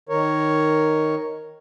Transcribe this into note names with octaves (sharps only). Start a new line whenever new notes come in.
D#3 A#4 C#5